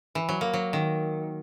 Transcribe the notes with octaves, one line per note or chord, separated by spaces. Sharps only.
E3
F#3
A#3
F#3
D#3